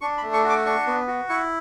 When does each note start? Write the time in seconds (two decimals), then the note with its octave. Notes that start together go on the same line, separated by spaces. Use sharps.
0.01 D4 C#6
0.18 B5
0.23 A3
0.33 C#6
0.44 F#4
0.50 D6
0.65 D4 C#6
0.87 B3
1.08 F#4
1.29 E4 C#6